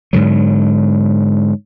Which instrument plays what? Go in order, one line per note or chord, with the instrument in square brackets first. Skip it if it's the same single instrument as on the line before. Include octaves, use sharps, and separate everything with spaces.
[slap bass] G#2 D3 F#3